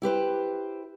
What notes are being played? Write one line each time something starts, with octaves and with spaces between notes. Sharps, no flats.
E4 G4 B4 C5